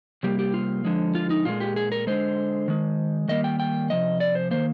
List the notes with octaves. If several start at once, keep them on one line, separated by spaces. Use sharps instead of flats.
C3 G3 A#3 G4
G4
F4
D3 F3 G#3
F4
D#4
A#2 G#3 F4
G4
G#4
A#4
D3 G#3 C5
D#3 G#3
D#3 G3 A#3 D#5
G5
G5
C3 F3 D#5
D5
C5
D#3 A#3 C5